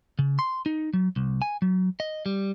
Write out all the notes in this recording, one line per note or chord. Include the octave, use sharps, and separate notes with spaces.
C#3
C6
D#4
F#3
C2
G#5
F#3
D#5
G3